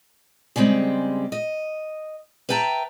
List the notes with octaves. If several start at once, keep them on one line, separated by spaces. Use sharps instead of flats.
C#3 G3 G#3 C4
D#5
B4 E5 G5 A5 A#5